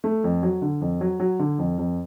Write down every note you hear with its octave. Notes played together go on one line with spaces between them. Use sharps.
A3
F2
F#3
D3
F2
F#3
F#3
D3
F2
F2